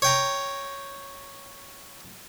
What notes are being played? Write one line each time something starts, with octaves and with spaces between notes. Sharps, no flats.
C#5 G5 A#5